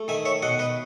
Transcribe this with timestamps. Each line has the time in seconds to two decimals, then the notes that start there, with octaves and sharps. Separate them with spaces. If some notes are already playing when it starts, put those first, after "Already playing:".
Already playing: A3
0.08 D#3 E5 G#5
0.25 C#5 E5
0.42 B2 D#5 F#5
0.59 B4 D#5